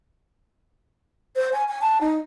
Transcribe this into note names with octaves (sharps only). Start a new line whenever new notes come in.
C5
G#5
G#5
A5
D#4